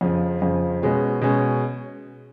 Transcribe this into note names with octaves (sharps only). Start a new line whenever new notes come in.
F2 C#3 F3
F2 C#3 F3
B2 G#3 C#4
B2 G#3 C#4